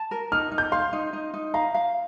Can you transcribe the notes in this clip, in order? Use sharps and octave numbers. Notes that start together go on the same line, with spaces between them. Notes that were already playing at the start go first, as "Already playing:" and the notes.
Already playing: A5
A#4
D#4 F6
D#4
G6
F5 C6
D#4
D#4
D#4
F5 A#5
F5